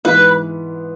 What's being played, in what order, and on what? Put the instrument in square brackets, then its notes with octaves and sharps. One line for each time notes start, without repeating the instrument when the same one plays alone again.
[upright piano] G#2 E3 B3 [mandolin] B4